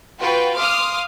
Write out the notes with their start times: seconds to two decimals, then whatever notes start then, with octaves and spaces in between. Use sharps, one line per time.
0.20 F4 F#4 B4 G5
0.56 F5 C6 D6 D#6 F6